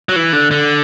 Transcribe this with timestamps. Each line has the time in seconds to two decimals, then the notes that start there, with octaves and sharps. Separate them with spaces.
0.09 F#3
0.16 E3
0.33 D3
0.51 D3